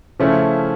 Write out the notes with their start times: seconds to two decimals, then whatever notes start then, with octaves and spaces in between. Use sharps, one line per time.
0.20 C#3 F3 A3 C#4 E4